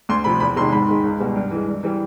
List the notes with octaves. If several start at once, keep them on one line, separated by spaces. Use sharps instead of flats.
D2 C6
C3 F3 B5
E2 B5
C3 D#3 G#3 C6
G#2 B5
D#3 G#3
C#2
B2 G3
G2
E3 G#3
G2
E3 G3